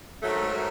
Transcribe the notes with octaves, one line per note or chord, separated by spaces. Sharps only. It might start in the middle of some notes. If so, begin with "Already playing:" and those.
G#2 D#3 F#3 A3
F#3 A3